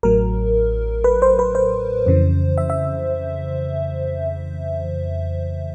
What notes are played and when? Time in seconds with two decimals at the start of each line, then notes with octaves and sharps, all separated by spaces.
0.03 A1 A2 F#3 A#4
1.04 B4
1.22 C5
1.39 B4
1.55 C5
2.06 F2 C#3 E3
2.58 E5
2.70 E5